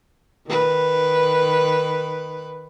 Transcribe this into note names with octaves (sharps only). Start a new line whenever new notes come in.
D#3 B4